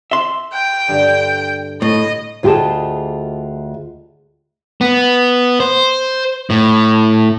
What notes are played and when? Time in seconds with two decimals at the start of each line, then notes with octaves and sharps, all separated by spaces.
0.11 E5 C6
0.53 G5
0.89 G2 D3
1.82 A2 D#5
2.43 D2 F4 G4 G#4 D#5 A5
4.81 B3
5.60 C5
6.50 A2